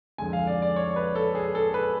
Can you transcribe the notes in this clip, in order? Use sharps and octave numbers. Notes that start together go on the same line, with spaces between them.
F2 D3 G#3 G#5
F5
D5
D5
C#5
B4
A4
G#4
A4
B4